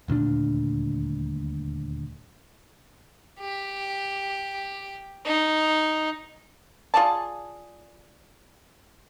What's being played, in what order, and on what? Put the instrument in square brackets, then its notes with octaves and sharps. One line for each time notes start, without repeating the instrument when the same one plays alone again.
[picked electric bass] D#1 D2 A#2 D4
[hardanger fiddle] G4
D#4
[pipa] F4 G#4 D5 A5